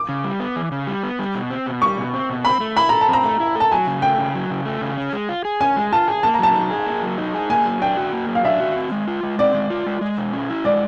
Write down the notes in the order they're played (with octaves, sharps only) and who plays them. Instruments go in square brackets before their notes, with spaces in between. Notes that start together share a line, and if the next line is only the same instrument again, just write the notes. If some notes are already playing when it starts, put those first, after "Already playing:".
Already playing: [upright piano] D6
[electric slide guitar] C#3
G3
B3
E3
C#3
G3
B3
G3
B2
C4
B2
[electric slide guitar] G3 [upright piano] C#6
[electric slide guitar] B2
C4
B2
[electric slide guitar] C4 [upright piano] B5
[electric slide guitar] A3
[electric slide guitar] E4 [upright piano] B5
[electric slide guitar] A4 [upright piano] A#5
[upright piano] A5
[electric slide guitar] C4
[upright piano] A#5
[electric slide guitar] A3
E4
[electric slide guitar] A4 [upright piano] A5
[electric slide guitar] F#3 [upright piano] G#5
[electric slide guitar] C#3
[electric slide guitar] A3 [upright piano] G5
[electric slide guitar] C#3
F#3
C#3
A3
C#3
C#4
G#3
F4
G#4
[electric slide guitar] C#4 [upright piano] G#5
[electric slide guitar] G#3
[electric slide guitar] F4 [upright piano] A5
[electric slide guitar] G#4
[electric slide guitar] A#3 [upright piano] A5
[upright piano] A#5
[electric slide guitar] F#3 [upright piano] A5
[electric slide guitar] D#4
G#4
A#3
F#3
D#4
G#4
[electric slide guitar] A#3 [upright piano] G#5
[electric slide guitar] F#3
[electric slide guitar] D4 [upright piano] G5
[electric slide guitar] F#4
A#3
F#3
[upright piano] F5
[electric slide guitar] D4 [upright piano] E5
[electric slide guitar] F#4
C4
G#3
F4
G#3
[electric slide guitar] C4 [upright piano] D5
[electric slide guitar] G#3
F4
G#3
G#3
B2
C#4
E4
[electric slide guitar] G#3 [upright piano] D5